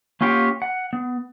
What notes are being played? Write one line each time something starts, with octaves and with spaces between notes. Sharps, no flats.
A#3 C#4 F4 G4 F#5
F#5
B3